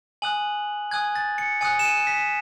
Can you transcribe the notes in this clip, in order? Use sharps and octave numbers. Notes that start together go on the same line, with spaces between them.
G#5 D#6 F#6 F#7
G#5 D#6 F#6 G#6
A6
C#7
G#5 D#6 F#6 C#7
E7
D#7
B6